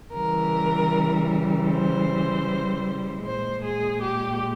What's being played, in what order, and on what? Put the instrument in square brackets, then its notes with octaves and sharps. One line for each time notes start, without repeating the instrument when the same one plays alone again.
[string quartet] C#3 E3 G3 A#4
C5
A#2 G#3 C5
G#4
G4